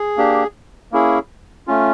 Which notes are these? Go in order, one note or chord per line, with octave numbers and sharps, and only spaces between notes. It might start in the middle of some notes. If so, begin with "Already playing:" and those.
Already playing: G#4
A#3 D4 G4
A#3 C#4 E4 G#4
A3 C#4 F4